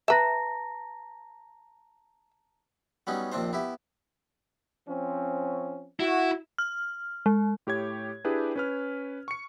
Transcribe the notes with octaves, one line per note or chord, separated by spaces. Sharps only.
B4 E5 A5 A#5 A#6
F#3 G3 B3 C#4 D#4
A#1 D#2 C4 D4 C5
B3 E4 G4
F3 C4 C#4
E4 F#4
F6
G#3
A2 G4 C#5 G#6
D4 E4 G4 G#4 B4
C#4 B4 F6
C#6 C#7